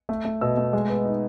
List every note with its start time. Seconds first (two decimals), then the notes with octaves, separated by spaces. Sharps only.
0.09 A3
0.25 A3
0.41 B2 E6
0.57 A3
0.73 G#3
0.89 B3
1.05 D#4